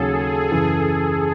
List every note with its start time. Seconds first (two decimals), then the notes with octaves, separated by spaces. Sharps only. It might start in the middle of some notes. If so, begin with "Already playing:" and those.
Already playing: D#2 C#3 F#3 C#4 G#4 A4
0.51 F#2 C#3 E3